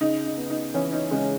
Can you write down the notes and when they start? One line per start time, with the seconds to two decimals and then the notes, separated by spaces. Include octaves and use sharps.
0.01 C#3 D#4
0.26 D#4
0.37 B3
0.50 D#4
0.74 E3 C#4
0.92 D#4
1.11 C#3 G#3